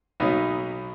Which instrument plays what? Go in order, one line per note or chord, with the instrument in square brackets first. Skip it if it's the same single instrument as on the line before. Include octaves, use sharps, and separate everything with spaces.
[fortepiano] B1 B2 F#3 B3 D#4